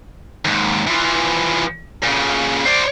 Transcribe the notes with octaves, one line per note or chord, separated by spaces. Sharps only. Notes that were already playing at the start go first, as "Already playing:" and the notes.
D#2 G#2
E3 F3
A#2 C#3
C5 D5